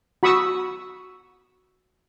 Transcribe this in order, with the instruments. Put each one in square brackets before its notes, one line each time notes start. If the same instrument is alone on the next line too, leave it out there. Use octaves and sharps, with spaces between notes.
[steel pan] F#4 B5 C#6 D#6 E6